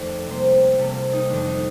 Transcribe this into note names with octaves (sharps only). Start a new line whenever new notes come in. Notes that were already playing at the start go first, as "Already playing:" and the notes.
Already playing: F2 D#3 A3 D5
C3 G3 A#3 C5
C3 G3 A#3 A4
F4
D#4
F2 D#3 A3 D4
D#4